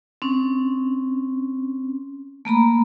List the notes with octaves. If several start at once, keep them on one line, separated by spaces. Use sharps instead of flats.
C4 C#4
A3 A#3 A#5 B5